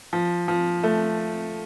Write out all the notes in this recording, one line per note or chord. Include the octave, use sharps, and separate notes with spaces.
F3
F3
A3